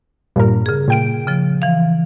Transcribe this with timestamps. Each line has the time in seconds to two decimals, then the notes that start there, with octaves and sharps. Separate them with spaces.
0.36 G2 A#2 A#4
0.66 C#3 G#4
0.88 A#2 G5 D7
1.27 C#3 F3
1.62 E3 F5